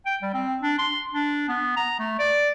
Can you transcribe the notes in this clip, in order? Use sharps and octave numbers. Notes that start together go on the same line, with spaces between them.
G5
G3
C4
D4
C6
D4
B3
A#5
A3
D5